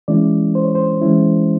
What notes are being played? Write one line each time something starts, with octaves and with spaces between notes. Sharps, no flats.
E3 G#3 C#4 E4 D5
C5
C#5
C5
E3 G#3 C#4 E4